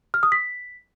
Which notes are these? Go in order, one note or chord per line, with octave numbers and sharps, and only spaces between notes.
F6
D#6
B6